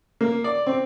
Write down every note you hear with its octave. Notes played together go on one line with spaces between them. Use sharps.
A#3
D5
C4